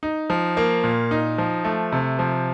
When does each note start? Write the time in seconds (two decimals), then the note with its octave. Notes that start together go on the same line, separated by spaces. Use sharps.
0.03 D#4
0.30 F3
0.57 A#3
0.84 A#2
1.11 D#4
1.38 F3
1.64 A3
1.92 C3
2.19 F3